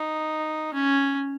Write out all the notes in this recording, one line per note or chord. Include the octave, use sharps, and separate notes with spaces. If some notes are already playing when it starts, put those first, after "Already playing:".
Already playing: D#4
C#4